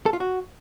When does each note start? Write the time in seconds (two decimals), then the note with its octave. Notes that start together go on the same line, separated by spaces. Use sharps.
0.06 A4
0.13 F4
0.20 F#4